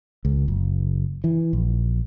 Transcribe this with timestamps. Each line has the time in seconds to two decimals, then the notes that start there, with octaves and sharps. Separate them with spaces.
0.25 C#2
0.48 F#1
1.24 E3
1.53 A#1